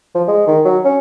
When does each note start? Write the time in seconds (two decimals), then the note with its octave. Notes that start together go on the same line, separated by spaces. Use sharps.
0.15 F3
0.28 G#3
0.47 D#3
0.65 F#3
0.85 C#4